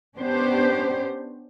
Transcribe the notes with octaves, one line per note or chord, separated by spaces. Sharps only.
B3 C#4 D4 G4 C5